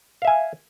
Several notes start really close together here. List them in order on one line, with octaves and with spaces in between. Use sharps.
F5 E5 G#5